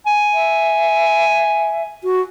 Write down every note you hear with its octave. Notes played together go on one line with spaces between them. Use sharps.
G#5
E5
F#4